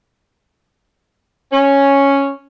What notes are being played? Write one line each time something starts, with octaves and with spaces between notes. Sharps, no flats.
C#4